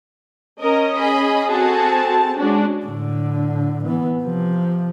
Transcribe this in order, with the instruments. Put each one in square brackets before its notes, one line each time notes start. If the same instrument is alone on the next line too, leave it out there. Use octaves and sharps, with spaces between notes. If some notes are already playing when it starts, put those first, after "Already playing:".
[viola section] C#4 D#5 [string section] A#4
[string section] G#4 B5
[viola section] C4 A5 [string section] F#4 G#4 A4
[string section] G#3 C#4 [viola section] D4 F#4
[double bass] A2 D3
E3 B3
C3 F3